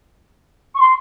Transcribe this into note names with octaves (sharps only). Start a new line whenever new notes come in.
C#6
C6